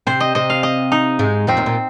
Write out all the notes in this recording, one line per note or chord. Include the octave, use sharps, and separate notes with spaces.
C3 C4 C5
D#5
C3 C4 D#5
F5
D#5
D#4
G#2 G#3
F2 F3 C4
D#2 D#3
A#2